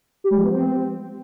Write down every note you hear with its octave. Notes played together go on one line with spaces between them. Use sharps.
G4
G#3
F3
B3
C4